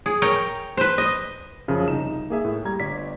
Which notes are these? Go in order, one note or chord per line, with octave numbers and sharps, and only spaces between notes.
G#4
A#4 C#5 G5
B4 C5
D#5
F#2 C#3 F3
C2 D#4 E7
A#3 G#4 E5 G#5
A2
G3 A#5 G#6
G1 D5 B6